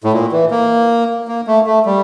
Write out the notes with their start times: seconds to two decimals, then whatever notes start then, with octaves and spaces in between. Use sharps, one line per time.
0.04 A2
0.13 A#2
0.32 E3
0.51 A#3
1.28 A#3
1.47 A3
1.66 A3
1.85 G3